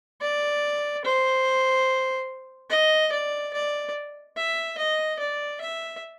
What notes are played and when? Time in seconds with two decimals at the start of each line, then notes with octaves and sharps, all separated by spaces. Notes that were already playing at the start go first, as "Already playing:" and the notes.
0.21 D5
1.05 C5
2.70 D#5
3.12 D5
3.53 D5
4.37 E5
4.78 D#5
5.19 D5
5.61 E5